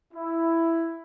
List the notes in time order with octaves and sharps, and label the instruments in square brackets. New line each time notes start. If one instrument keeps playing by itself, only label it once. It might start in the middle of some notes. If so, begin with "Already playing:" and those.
[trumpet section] E4